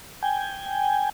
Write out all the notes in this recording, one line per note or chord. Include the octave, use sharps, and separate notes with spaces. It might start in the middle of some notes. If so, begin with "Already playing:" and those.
G5 G#5